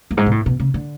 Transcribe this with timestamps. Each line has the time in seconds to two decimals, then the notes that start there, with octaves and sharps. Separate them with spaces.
0.11 F#2
0.17 G#2
0.26 B2
0.31 A2
0.46 B2
0.60 C#3
0.74 D3